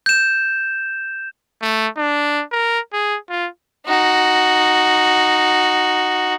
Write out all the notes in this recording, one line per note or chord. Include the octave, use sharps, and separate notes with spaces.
G6 E7
A3
D4
A#4
G#4
F4
D#4 F#4